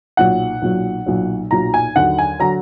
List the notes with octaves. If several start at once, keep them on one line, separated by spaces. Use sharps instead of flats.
B1 A#2 F#3 F#5
B1 A#2 F#3
B1 A#2 F#3
B1 A#2 F#3 A#5
G#5
D#2 D3 F#3 F#5
G#5
D3 F#3 A#5